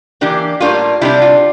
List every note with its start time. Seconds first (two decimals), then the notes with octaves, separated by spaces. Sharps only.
0.21 E3 A#3 D4 G4
0.60 A2 G3 A#3 D4 F4
1.01 C3 G3 D4 E4
1.22 F4